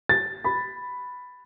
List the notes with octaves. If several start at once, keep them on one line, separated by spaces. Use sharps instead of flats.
A6
B5